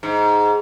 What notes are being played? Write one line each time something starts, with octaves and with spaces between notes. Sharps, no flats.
G#2